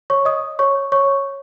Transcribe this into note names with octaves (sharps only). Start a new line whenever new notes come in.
C#5 C#6
D#5 D#6
C#5 C#6
C#5 C#6